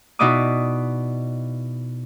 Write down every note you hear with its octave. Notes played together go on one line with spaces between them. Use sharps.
B2 D#4 E4 D5 D6 D#6